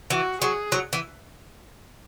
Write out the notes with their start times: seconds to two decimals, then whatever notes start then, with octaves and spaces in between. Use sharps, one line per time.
0.10 E3 F#4
0.41 F#3 G#4
0.72 F#3
0.93 E3